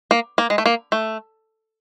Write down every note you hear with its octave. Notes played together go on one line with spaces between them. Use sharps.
A#3
A#3
G#3
A3
A#3
A3